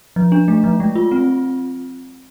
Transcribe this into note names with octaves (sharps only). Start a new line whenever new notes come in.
F3
D4
A3
F3
G#3
F4
C4